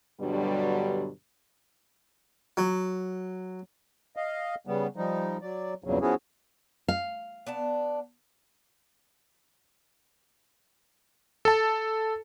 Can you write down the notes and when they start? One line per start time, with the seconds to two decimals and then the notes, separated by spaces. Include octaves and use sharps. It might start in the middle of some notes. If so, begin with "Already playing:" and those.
0.20 G2 B2 D3 F#3 G3
2.57 F#3
4.16 D#5 F5
4.67 C#3 G3 B3
4.96 F3 G3 D#4
5.42 F#3 D5
5.84 E2 G2 A#2 C#3 F#3
6.01 F3 B3 C#4 E4 F#4 G#4
6.88 F5
7.47 B3 D4 A5
11.45 A4 A5